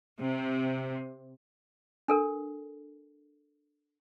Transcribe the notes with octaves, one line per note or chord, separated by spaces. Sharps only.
C3
D4 A4 A#4